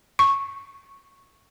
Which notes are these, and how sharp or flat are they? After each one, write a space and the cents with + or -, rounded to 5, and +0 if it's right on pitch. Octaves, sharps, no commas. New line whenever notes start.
C#6 -10